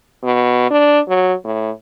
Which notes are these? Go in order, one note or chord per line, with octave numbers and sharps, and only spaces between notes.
B2
D4
F#3
A2